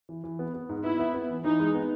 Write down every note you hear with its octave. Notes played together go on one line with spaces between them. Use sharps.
E3
E3
B3
B3
G#2
B3 E4
B3
B3
E3
E3 D#4
G#3
B3